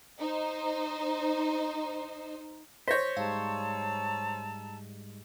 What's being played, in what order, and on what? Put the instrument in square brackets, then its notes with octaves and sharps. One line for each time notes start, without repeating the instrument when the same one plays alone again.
[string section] D#4 C5
[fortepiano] C5 C#5 [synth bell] G6 A#6 B6
[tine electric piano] G#2 G3 G#3 [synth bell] F5 [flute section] A5 A#5 E6